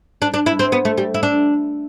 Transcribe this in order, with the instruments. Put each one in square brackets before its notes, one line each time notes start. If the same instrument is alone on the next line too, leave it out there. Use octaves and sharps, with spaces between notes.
[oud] D4
D4
E4
C4
B3
A3
G3
E4
D4